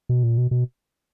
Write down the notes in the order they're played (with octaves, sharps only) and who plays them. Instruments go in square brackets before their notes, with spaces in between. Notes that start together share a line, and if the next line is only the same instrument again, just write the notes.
[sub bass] B2
A#2
B2
B2